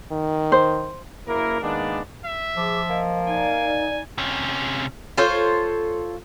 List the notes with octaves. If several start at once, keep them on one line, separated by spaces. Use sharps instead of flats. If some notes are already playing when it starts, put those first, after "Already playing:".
D#3
C5
F#1 A#3 E4 A#4
D#3 G#3 A#3 B3 D4
E5
F3 G#4 D6
A#3 D#5
D#4 D5 G#5
C3 C#4
F4 A4 C5 C#5